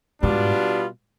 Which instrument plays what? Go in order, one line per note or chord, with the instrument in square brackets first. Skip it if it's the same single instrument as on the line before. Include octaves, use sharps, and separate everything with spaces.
[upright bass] G#2 [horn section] B2 G3 B3 D4 F4